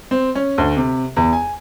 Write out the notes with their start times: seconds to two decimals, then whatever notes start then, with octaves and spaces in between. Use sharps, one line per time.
0.11 C4
0.35 C#4
0.58 D2
0.77 C3
1.16 E2
1.33 G#5